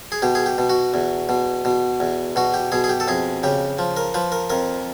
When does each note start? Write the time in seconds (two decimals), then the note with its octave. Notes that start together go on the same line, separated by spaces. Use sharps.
0.12 G#4
0.22 B2 G4
0.35 G#4
0.46 G4
0.58 B2
0.70 F#4
0.94 E2
1.29 B2
1.65 B2
2.00 E2
2.36 B2 F#4
2.54 G4
2.72 B2 G#4
2.84 G#4
2.89 G4
3.00 A4
3.08 F2 G#4
3.43 C#3 G4
3.79 F3
3.97 A#4
4.14 F3 B4
4.32 A#4
4.50 F2 A#4